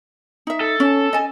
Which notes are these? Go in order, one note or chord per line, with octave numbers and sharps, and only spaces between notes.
D#4 E5
A4
C#4
D#5 G#5